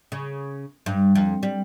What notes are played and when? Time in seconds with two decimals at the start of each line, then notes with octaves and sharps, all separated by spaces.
0.12 C#3
0.86 G2
1.15 F2
1.43 G3